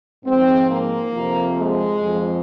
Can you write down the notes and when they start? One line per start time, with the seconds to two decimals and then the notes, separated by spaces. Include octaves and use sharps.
0.24 G#2 F3 C4
0.69 A#3
1.13 F2 C3 F3
1.58 G#3
2.02 F2 F3